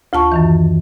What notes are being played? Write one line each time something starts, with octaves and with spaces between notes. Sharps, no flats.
D2 F4 A5 C#6
F#2 D#3 E3